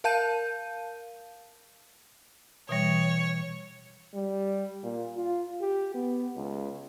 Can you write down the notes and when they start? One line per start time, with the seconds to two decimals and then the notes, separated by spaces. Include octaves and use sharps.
0.04 A#4 F5 A5 G6 D#7
2.69 B2 E3 G3 C#5
4.14 G3
4.83 A#2
5.17 F4
5.61 G4
5.94 B3
6.36 C#2